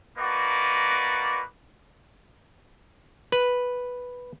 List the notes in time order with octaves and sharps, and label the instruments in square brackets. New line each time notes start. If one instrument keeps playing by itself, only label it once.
[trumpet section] A#3 D#4 F#4 B4 D5
[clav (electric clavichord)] B4